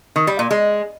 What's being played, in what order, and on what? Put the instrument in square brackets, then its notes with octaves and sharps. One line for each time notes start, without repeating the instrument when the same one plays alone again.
[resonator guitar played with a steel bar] D#3
G3
A#2
G#3